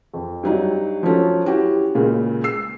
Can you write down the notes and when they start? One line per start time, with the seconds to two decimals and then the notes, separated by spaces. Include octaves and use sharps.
0.13 F2
0.43 G2 F#3 D#4
1.03 F3 F#3 C#4 A4
1.44 C#4 E4 F#4 G4
1.95 C#2 A#2 C#3
2.44 E6 C7